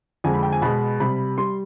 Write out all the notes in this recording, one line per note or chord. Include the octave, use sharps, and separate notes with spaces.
F2 D3 G#3 G#5
B5
G5
G#5
B2 G#3 B5
C3 G3 B5
G3 C6